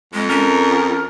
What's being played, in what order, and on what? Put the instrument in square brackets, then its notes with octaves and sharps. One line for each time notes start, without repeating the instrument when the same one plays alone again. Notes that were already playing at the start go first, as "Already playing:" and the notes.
[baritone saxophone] F2 [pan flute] G#3
[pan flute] C#4 [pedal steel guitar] A#4